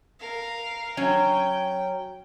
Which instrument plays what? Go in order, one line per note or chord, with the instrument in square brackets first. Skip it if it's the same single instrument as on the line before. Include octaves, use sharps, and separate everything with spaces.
[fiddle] A#4 F5
[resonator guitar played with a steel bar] F#3 C#4 [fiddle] G5